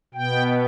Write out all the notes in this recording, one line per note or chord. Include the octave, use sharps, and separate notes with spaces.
B2 B3 G5